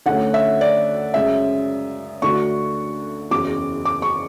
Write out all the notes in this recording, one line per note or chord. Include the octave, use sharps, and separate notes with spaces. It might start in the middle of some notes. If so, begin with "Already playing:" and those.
D2 D3 A3 C#4 F#5
E5
D5
F#2 C#3 G#3 E5
D2 D3 A3 D4 F#4 C#6
F#1 E2 C#3 D6
D6
C#6